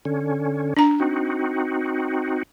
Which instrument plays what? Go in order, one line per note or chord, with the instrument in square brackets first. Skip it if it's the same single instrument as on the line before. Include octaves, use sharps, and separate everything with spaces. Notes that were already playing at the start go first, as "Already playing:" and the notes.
[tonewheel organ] D3 C#4
[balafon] D4 A#5
[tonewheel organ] C4 D#4 F#4